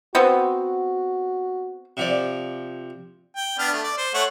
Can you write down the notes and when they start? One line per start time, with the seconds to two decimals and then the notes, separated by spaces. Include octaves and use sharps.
0.15 B3 C4 F#4
1.97 C3 F3 D5
3.36 G5
3.59 B3 D4 F6
3.72 A3
3.84 D5
3.98 C5
4.14 A3 C#5 F#5